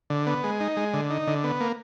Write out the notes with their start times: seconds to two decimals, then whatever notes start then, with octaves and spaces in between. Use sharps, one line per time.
0.10 D3
0.27 B3
0.44 G#3
0.60 D#4
0.77 G#3
0.94 D3
1.10 D#4
1.27 D3
1.44 B3
1.60 A#3